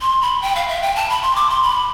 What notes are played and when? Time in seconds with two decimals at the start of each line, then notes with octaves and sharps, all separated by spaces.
0.01 C6
0.22 B5
0.42 G5
0.55 F5
0.68 E5
0.82 G5
0.96 A5
1.09 B5
1.22 C6
1.36 D6
1.50 C6
1.62 B5